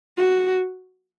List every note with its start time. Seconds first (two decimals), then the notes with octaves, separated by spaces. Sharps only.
0.17 F#4